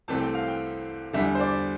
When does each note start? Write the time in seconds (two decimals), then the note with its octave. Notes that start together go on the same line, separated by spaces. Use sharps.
0.08 C2 C3 E3 A3 C4 A5
0.20 G5
0.34 F5
0.47 G5
1.13 E2 D3 G3 E5
1.35 C5
1.40 D5